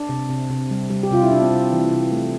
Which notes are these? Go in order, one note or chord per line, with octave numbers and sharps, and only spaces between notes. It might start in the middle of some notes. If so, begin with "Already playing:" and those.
Already playing: D4
C3
C3
C3
G3
G3
G4
C3 F4
E4
C3 D4
C4
C3
E3
C3
A3